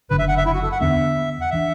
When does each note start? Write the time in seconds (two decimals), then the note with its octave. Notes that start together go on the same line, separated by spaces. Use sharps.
0.10 F#1 F#2 D3 B4
0.19 E5
0.28 F#5
0.37 E5
0.46 E4
0.54 F#4
0.63 A4
0.72 F#5
0.81 E2 D3 B3 D4 E5
1.41 F#5
1.50 E3 D4 E5